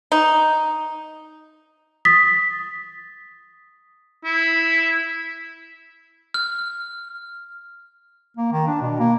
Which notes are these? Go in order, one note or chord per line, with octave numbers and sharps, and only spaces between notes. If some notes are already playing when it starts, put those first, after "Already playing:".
D#4
D#6 A6 B6
E4
F6
A#3
D#3
D4
B2
A#3